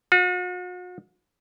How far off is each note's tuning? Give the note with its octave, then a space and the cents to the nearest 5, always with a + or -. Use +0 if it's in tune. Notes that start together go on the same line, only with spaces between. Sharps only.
F#4 -45